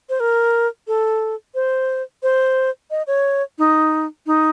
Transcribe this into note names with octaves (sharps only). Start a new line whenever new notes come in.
C5
A#4
A4
C5
C5
D#5
C#5
D#4
D#4